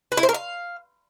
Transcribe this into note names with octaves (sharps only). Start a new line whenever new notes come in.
B4
E4
C5
A#4
F5